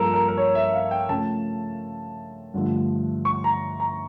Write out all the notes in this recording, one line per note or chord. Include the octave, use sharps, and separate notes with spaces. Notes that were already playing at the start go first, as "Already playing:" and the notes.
Already playing: G2 F3 A#3 A4 A#4
A#4
A#4
C#5
E5
F5
G5
C#3 F3 A3 A5
G2 D3 F3 A3
C#6
A#5
A#5